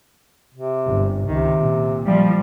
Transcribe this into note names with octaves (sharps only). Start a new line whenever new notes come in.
C3
G1
C#2 C3 D#3
A#2
F3 G3